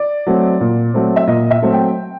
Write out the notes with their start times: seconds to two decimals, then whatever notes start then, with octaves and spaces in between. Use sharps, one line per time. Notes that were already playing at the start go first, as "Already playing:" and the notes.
Already playing: D5
0.26 F#3 A3 C4
0.61 A#2
0.94 F#3 A3 C4
1.16 E5
1.27 A#2 D#5
1.51 E5
1.62 F#3 A3 C4
1.73 G5